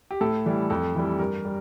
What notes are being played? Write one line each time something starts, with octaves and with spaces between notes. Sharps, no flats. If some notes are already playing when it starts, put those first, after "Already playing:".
G4
A2 A4
E3 G3
F2 A4
E3 G3
G2 A#4
G3